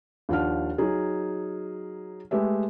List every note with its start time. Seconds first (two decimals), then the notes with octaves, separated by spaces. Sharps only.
0.29 D#2 F3 D4 F#5 F6
0.78 F#3 D#4 G#4
2.31 G#3 A3 G4 B4 E5